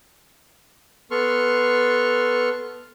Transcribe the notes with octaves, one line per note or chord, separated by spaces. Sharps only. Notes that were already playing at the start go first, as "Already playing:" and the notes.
B3 A4 C6 C#6 F6